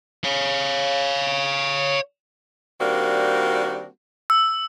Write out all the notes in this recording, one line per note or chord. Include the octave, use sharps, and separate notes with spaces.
C#5 F5
D#3 G3 A#3 C4 D4 F#4
E6